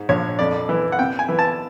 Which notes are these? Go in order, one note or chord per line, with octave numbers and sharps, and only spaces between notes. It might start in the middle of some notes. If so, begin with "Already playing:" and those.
Already playing: G#2
A#1 C#5
F2 D5
E3
F#5
C3 G5
G#5
E3
A5